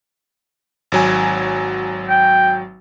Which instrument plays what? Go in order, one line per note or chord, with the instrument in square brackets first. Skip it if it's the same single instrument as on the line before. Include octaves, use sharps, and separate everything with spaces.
[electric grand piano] G#1 F#3 G#5
[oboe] G5